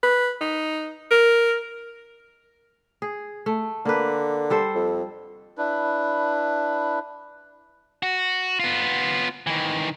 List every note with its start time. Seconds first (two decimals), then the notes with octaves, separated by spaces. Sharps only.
0.03 B4
0.41 D#4
1.11 A#4
3.02 G#4
3.46 A3
3.85 D3 A#3 B4
4.50 G3 A4 C5
4.75 F2
5.58 D4 E4 B4
8.03 F#4
8.60 B3 F4
9.47 D#3 E3